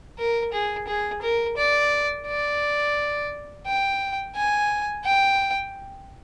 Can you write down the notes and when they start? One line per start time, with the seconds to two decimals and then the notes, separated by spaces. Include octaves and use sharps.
0.18 A#4
0.52 G#4
0.88 G#4
1.22 A#4
1.57 D5
2.27 D5
3.66 G5
4.36 G#5
5.05 G5